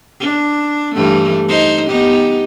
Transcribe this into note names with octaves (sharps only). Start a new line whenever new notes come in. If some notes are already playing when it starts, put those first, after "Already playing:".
D4
G2 E3 A3
D#4 C5
B3 D#4 G4